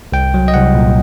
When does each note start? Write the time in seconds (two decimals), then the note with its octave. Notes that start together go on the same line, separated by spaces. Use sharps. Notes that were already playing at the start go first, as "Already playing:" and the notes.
0.12 C2 G5
0.34 F#3
0.48 D#5
0.54 C2 F#5
0.74 A#2